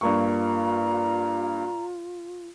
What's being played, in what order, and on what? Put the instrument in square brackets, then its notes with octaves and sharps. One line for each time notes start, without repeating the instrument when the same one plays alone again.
[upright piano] G2 A#3 C#6 [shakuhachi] F4 [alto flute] A#5